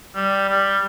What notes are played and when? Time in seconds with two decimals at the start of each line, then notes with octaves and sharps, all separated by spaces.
0.15 G3
0.49 G3